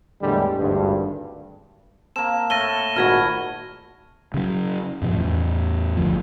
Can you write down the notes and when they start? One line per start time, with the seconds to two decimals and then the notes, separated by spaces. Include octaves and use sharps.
0.22 E2 A2 D3 G3 G#3
0.58 G#1 D2 G2
2.16 A#3 C4 A5 E7
2.50 A2 A4 C#6 A#6 D#7 G7
2.96 G#1 A#2 F#4 B5 F6 G#6 A#6
4.34 C#3 F#3
5.02 G2 B2 F3
5.13 E2 A2
5.97 G1 D2 F3